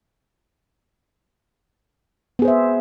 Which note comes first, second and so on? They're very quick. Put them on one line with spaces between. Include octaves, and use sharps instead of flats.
B3 G#4 C5 E5